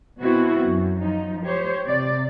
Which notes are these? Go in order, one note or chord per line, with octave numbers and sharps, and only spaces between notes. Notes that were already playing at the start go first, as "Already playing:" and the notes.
B2 B3 C4 E4 F#4
F#2
F3 D#4
G4 C5 C#5
C3 D5